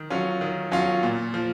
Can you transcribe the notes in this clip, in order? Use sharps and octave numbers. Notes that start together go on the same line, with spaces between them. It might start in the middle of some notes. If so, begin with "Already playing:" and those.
Already playing: D#3
F#3 C#4 F4
D#3
F#3 C#4 F4
A#2
F3